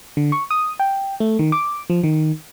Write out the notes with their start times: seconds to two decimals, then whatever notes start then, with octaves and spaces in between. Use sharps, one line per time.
0.17 D3
0.32 C#6
0.51 D#6
0.80 G5
1.20 A3
1.39 D#3
1.52 D6
1.90 F3
2.04 D#3